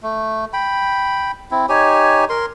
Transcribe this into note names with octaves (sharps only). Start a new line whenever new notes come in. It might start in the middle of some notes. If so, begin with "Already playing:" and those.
A3
G5 B5
C4 E4
D#4 G4 C#5 G#5
A#4 C6